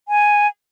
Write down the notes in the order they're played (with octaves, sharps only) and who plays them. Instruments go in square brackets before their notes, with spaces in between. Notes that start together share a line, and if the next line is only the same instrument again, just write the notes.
[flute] G#5